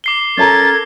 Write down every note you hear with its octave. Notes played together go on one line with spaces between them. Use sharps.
D6 C7 G7
C#4 A4 A#4 A5 A#5 G#6 A6